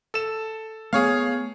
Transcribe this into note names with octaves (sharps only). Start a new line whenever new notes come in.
A4 E7
A3 B3 G#4 C#5 F5